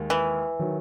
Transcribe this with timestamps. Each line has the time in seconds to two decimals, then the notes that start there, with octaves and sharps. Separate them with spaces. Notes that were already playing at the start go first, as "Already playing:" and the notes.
Already playing: D#2 D#3 G#3
0.10 E3
0.59 D#3 F#3